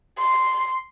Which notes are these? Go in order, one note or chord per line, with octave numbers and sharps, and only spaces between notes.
C6